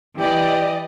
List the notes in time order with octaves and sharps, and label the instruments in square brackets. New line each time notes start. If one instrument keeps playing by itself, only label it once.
[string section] E3 D5 D#5 [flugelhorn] G4